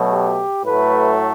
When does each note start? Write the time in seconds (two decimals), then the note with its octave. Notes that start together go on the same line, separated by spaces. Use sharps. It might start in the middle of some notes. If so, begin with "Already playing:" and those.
Already playing: B2 F#3 A3
0.12 G4
0.64 A2 F#3 A3 B4